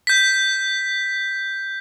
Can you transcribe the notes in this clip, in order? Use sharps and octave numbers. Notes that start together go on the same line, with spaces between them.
G6 B6